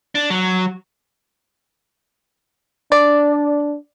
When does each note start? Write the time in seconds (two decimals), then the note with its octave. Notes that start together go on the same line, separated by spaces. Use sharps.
0.15 D4
0.30 F#3
2.92 D4 D5